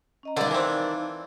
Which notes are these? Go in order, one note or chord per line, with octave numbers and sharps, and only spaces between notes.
C#4 D#5 A#5
G2 D3 D#3 D4 D#4 F5
E3 C4